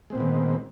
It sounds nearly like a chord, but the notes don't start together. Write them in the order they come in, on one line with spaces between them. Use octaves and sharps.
G#3 C4 A#2 B3 D#3